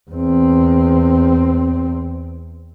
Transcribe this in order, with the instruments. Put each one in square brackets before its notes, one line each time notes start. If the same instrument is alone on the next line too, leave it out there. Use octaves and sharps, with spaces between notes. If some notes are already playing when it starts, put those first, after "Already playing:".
[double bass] E2 C4